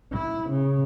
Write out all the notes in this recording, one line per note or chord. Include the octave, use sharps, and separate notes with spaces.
E4
C#3